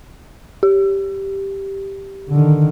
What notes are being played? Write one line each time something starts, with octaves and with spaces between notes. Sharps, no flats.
G4
D3 D#3